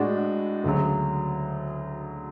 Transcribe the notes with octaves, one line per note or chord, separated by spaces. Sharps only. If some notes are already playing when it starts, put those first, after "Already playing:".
Already playing: A2 G#3 D4 F#4
D2 C#3 F#3